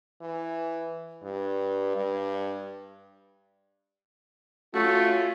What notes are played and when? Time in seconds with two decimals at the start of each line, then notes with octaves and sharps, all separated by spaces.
0.21 E3
1.23 G2
1.96 G2
4.74 A3 C#4 F4 F#4